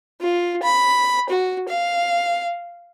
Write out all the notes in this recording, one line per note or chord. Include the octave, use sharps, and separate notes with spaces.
F4
B5
F#4
F5